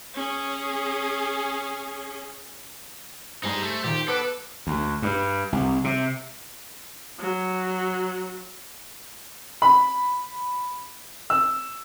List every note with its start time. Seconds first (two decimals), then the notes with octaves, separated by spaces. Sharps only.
0.14 C#4 G#4
3.43 G2 G3 D#4 G#4 C5
3.62 A3
3.84 A#2 D#3 G4
4.08 B3 A4 B4 D6
4.67 D2
5.02 G2
5.52 C2
5.84 C3
7.20 F#3
9.62 B5
11.30 E6